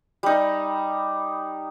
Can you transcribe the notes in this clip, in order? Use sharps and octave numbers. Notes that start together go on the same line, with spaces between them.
G3 D#4